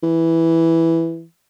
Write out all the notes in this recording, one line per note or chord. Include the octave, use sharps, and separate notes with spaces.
E3